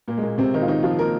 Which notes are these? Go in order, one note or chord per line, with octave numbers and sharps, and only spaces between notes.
A#2 A#3
G#3
A#2 A#3
C3 C4
D#3 D#4
F4
D#3 D#4
F3 F4
A#3 A#4